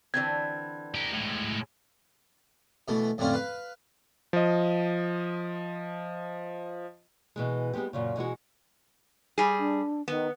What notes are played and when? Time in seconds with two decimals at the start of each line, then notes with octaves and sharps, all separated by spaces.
0.14 D3 E3 C4 G#6
0.95 G4 A#4
1.13 A2 G#3
2.88 B2 E3 A3
3.18 F2 A2 D3 C4 C#4 F4
3.34 B4 F5
4.33 F3 D#5
7.36 B2 E3 G#3
7.73 G3 G#3 B3 C4 G4
7.93 F#2 A#2 C#3
8.16 B2 E3 G#3 F#4
9.38 G3 G#4
9.59 D4
10.08 D#3 B3